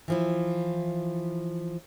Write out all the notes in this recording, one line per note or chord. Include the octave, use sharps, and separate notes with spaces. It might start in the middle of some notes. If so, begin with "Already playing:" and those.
E3 F3 E4